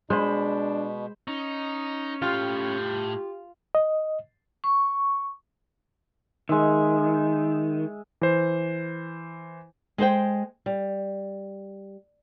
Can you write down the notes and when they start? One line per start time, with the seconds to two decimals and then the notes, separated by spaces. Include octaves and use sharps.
0.10 B2 G#3 D4 C5 B5
1.28 C#4 D#4
2.22 A2 F4 G4 G5
3.75 D#5
4.64 C#6
6.49 D#3 G#3 E5
8.21 E3 C5
9.98 G#3 G#4 C5 G5
10.66 G3